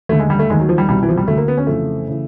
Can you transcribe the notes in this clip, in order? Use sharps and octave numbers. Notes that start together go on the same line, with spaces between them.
D#2 D3 A3
G#3
G3
A3
D#2 D#3 G#3
F#3
F3
G3
C2 B2 G3
E3
F3
G3
D2 D3 A3
A#3
B3
C#4
F2 C#3 E3 A3
C#3 E3